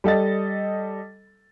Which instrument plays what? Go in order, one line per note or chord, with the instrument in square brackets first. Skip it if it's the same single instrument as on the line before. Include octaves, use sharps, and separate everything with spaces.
[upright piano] G3 A4 D#5 A6